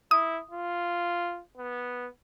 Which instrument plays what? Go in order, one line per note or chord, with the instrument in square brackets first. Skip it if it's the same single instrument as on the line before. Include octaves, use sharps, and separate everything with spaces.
[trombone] E4 [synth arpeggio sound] D#6
[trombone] F4
B3